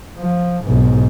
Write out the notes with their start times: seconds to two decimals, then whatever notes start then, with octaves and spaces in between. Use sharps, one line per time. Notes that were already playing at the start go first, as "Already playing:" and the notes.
0.18 F3
0.66 B1 G#2